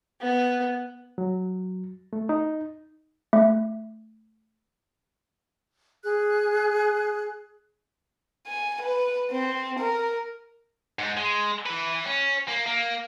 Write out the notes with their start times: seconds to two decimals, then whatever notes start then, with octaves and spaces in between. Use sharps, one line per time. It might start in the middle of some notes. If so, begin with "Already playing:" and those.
0.21 B3
1.18 F#3
2.13 A3
2.29 D#4
3.33 A3
6.03 G#4 F#6
8.47 G#5
8.82 B4
9.31 C4
9.80 A#4
10.99 G#2
11.17 G#3
11.66 E3 B4
12.05 C#4
12.48 A#3
12.67 A#3